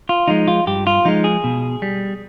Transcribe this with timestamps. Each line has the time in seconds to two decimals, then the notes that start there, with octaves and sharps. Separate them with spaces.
0.09 F4
0.28 F3 G#3 D#4
0.48 F4
0.67 G2 G4
0.87 F4
1.05 F3 G#3 D#4
1.24 G#4
1.44 B2
1.82 G3